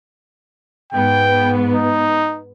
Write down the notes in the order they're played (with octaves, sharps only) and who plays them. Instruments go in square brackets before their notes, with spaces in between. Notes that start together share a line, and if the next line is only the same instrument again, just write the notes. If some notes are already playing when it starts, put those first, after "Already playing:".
[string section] G#2 B3 [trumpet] G5
[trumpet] D#4